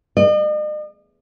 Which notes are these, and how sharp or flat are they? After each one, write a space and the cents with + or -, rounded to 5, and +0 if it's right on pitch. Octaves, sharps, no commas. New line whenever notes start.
D#5 -45